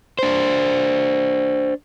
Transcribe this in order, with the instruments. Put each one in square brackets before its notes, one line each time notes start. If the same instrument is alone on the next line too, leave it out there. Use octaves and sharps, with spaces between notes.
[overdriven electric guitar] D4 C5